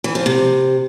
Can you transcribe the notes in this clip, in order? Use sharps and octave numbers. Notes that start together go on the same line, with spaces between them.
E3
F3
C3